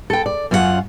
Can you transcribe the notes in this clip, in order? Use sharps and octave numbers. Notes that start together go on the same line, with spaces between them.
A4 G5
D5
F#2 C#4 F4 F#4 F#5